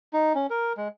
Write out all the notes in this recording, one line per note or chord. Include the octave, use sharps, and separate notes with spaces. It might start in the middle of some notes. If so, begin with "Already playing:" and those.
D#4
C#4
A#4
G#3